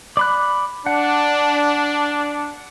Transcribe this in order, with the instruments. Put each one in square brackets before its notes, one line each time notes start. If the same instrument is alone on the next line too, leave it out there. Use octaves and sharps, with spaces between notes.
[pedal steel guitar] D5 B5 F#6
[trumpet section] D4 [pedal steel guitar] F#5